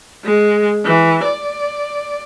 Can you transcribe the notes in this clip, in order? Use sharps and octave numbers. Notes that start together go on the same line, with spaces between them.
G#3
E3
D5